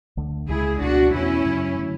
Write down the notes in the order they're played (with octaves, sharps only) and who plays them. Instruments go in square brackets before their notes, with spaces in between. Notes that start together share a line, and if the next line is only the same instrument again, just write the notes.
[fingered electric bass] D2 D3 A3
[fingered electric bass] C#2 C#3 G#3 [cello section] E4 G#4
[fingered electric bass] C#2 B2 A3 [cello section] D4 F#4
[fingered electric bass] E2 B2 A3 [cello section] C#4 E4
[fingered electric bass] F#2 C#3 F#3
D3 F#3 A3